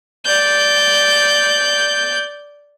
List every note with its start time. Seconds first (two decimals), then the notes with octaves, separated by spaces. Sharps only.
0.25 D5 G6